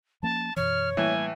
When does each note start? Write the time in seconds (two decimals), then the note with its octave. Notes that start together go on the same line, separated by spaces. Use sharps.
0.23 F3 A#3 C#4 A5
0.56 F#2 B2 E3 C#5 F6
0.97 A2 E3 G3 A#3 G#5